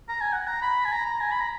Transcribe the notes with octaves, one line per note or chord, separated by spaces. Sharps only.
A#5
G#5
F#5
A#5
B5
G#5
A#5
A#5
G#5
B5
A#5